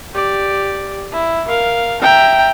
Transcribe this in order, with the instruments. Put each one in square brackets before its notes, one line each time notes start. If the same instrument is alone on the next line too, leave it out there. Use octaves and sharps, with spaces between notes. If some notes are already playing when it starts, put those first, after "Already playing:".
[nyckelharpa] G4 D5
E4
A#4 F5
[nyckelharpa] E5 A#5 [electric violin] G5